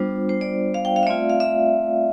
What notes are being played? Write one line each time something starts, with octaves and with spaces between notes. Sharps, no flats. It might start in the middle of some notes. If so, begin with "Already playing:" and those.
Already playing: G3 B3 D4 F4 C5
C5
D5
F5
G5
F5
E5
A3 C4 F4 D5
F5
E5